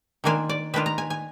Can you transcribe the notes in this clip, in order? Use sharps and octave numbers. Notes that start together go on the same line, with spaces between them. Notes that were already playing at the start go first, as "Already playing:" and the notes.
D#3 A#3 D4 F4 G#5
D5
D#3 A#3 D4 F4 B4
A#5
G#5
G#5